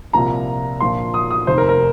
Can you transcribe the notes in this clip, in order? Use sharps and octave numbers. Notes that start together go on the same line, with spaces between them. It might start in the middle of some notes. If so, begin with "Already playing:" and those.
C2 A#2 F3 A#5
A#1 A#2 F3 C6
D#6
D#6
F1 D#2 D#3 C5
A#4
A#4